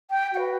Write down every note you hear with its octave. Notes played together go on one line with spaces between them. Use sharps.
G5
F#4 B4 F#5